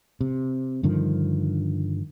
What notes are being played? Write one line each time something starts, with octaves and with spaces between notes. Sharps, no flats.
C3
G2 D3 D#3 F3